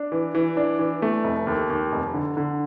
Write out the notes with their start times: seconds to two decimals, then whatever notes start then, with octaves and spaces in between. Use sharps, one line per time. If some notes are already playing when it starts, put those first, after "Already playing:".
Already playing: D4
0.12 E3
0.35 E3
0.57 D4
0.79 E3
1.02 A3
1.24 F1
1.47 D#2
1.70 D#2
1.92 F1
2.14 D3
2.37 D3